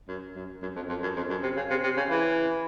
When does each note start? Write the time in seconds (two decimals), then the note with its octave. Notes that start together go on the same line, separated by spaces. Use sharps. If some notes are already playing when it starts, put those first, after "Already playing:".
0.08 F#2
0.36 F#2
0.62 F#2
0.76 F2
0.89 F2
1.03 F#2
1.16 F2
1.30 F#2
1.43 C3
1.57 C#3
1.70 C3
1.84 C3
1.97 C#3
2.10 E3